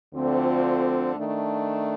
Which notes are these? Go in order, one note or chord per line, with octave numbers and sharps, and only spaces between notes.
D2 D3 F3 C4 F4
D#3 A3 D4